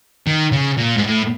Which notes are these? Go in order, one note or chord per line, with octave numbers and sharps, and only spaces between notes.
D#3
C#3
A#2
G#2
A2